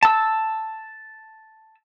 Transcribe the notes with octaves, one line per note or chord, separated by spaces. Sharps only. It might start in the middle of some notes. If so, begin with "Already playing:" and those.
A5 E6